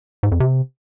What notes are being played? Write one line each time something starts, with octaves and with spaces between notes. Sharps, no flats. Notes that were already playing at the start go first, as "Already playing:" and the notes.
G#2
F2
C3